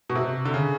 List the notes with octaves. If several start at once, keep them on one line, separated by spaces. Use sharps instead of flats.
B2
C3
D3
C#3